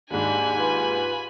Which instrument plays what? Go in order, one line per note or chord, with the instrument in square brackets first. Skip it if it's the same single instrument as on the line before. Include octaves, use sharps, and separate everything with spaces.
[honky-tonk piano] D#2 G#2 [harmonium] D4 [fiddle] G#5 B5
[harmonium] F4 B4